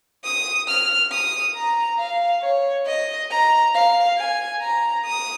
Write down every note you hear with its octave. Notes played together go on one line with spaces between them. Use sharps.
D#6
F6
D#6
A#5
F5
C#5
D#5
A#5
F5
G#5
A#5
D#6